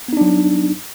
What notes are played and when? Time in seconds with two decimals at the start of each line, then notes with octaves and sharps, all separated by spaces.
0.08 B3
0.13 D#4
0.17 D4
0.21 F#3